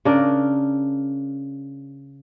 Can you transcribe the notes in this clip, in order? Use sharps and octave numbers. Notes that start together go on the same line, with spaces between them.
C#3 D4 A#4